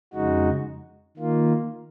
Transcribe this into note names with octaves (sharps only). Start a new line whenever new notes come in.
F2 C#3 G#3 D#4 F#4
D#3 A#3 F4